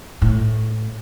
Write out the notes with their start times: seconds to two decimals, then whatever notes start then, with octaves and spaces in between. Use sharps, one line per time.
0.22 A2